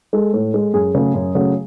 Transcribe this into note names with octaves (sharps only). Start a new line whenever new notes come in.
G#3 A4
A2
G#3
F#2 G#4
C#3 F#3 A3
F#2
C#3 F#3 A3